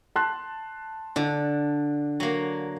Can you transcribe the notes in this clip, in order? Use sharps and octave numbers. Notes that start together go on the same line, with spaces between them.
A5 C6 F#6
D3 D4
F#3 A#3